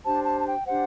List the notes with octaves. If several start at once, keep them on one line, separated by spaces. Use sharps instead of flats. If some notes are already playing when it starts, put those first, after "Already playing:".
D4 G4 C5 A5
A5
A5
G5
D4 G4 C5 F#5